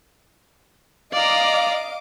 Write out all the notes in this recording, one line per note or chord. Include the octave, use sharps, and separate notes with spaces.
D5 D#5 F5 A#5 D6